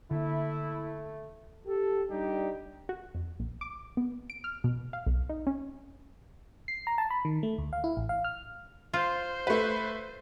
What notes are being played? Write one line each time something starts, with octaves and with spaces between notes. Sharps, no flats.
D3 A3 A#3 E4
G4 A4
G3 D4 D#4 G4
F#4
F2
A#1
D6
B3
D7
F6
B2
F5
B1
D#4
C#4
C7
A#5
A5
B5
D#3
A3
D2
F5
E4
A1
F5
F6
F4 C5
A3 B4